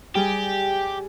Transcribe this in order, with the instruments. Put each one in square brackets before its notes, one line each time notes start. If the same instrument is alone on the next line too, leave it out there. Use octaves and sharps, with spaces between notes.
[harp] G3 G#4 [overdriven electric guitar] G4